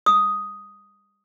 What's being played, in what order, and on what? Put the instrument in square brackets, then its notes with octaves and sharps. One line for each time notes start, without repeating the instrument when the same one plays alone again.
[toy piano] D#6